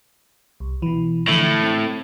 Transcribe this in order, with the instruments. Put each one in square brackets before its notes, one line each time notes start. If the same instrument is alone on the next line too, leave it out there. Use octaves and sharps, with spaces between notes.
[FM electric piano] C2
B2 E3
[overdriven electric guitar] A2 [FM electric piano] D3 E3 F3
[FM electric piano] C4 A6